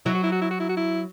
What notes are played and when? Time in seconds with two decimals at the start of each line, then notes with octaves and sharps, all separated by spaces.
0.06 F#3 E4
0.15 F#4
0.23 E4
0.32 F#4
0.41 E4
0.51 F#4
0.60 E4
0.69 F#4
0.77 E4